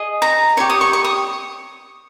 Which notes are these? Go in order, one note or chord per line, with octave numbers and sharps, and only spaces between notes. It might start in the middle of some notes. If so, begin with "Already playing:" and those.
Already playing: G#4 D#5
A#5
G4 C#5 C#6
D#6
C#6
C#6
D#6